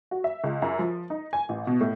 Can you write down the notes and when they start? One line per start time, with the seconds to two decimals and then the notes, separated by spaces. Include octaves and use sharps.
0.11 F#4
0.24 E5
0.44 C#2
0.62 F#2
0.79 F3
1.10 D#4
1.33 G#5
1.49 A1
1.67 B2
1.81 A2